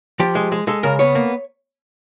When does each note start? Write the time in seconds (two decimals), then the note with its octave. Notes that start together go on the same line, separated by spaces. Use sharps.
0.20 F3 G4
0.35 G#3
0.52 G#3
0.67 G#3 A4
0.83 C#3 A#4
0.99 B3 C#5
1.15 A#3